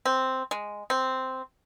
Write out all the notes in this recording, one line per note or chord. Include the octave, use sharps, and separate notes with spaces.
C4
G#3
C4